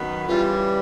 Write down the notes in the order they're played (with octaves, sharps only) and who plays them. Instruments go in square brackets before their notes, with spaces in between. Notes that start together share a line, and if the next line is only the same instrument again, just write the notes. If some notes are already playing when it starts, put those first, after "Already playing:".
Already playing: [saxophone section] F#2 D#3 F#3 B3
[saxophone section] C#3 E3 G3 [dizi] F4